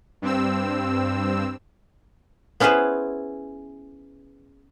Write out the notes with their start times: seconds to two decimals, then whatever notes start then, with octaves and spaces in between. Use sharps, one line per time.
0.22 G2 C4 E6
2.60 B3 C#4 E4 G#4 B4 C5